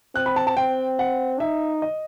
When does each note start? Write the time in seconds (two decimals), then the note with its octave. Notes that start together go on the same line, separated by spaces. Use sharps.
0.15 C4 F#6
0.26 B5
0.36 A5
0.47 A5
0.57 C4 G5
0.99 F#5
1.40 D#4 E5
1.82 D#5